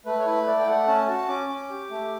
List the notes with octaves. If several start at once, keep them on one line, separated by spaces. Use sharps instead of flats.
A3 B4
C#5
E4 B4
A3 D5
G5
A3 F#5
C#4 A5
F#4 A5
C#4 D6
C#4
G4
A3